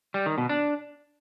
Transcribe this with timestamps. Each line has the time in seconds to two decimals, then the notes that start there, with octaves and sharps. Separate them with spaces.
0.14 G3
0.26 D#3
0.38 B2
0.49 D4